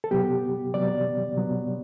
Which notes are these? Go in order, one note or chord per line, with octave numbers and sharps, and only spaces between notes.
A4
C3 F#3 B3 G4
C3 F#3 B3 D5
C3 F#3 B3